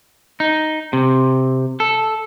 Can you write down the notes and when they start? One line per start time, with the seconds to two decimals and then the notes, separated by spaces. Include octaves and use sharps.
0.40 D#4
0.93 C3
1.80 A4